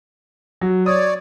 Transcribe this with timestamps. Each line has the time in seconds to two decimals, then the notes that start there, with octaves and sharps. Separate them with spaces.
0.61 F#3
0.86 C#5 D5 D#6